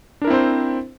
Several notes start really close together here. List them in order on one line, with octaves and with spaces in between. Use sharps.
D4 A#4 E4 C4 C5